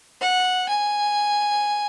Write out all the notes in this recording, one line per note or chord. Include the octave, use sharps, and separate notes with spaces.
F#5
G#5